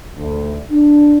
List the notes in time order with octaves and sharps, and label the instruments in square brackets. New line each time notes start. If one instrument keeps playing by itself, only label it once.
[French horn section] D2
D4